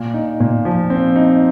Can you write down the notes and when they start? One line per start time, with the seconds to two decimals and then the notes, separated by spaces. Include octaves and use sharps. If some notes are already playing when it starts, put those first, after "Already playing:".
Already playing: A#2
0.14 D#4
0.40 A#2
0.65 F3
0.90 C4
1.16 D#4